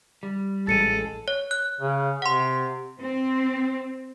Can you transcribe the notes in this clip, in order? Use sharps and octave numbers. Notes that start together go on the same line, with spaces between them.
G3
A1 G#3 A4 A6 C#7 D#7
C#5
F#6
C#3
C3 F#5 C6
C4